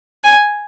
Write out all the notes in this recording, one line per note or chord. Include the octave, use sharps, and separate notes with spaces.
G#5